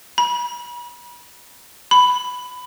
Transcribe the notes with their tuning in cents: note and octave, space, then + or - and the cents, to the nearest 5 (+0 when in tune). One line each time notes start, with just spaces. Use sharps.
B5 -40
B5 +10